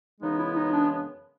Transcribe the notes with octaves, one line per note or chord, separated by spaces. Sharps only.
F#2 C#3 E3 G#3 B3 D#4
E4
D#4
D4